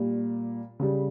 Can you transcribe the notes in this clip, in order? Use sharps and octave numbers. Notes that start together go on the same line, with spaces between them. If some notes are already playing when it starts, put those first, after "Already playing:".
Already playing: A#2 G3
C#3 G3